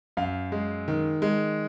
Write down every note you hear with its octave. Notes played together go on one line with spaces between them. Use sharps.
F#2 F5
G#3
D#3
G#3